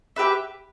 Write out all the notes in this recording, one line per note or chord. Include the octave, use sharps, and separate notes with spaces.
G4 B4 E5